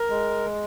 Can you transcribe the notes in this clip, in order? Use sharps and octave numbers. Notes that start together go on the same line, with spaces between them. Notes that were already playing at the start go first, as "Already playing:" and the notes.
Already playing: A#4
G#3